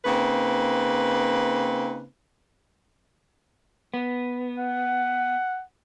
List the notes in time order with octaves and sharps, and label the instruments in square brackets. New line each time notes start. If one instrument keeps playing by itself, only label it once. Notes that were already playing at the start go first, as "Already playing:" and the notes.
[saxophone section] C#3 A#3 C4 D#4 B4
[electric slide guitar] B3
[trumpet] F#5